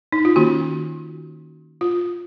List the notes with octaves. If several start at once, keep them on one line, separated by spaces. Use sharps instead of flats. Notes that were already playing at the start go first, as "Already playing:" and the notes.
D#4
F4
D#3 A#3 C#4 F#4
F4